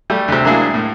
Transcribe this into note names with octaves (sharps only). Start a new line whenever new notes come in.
G3 A3
D2 C3
F#3 G#3 A#3 D4 E4 G#4
A2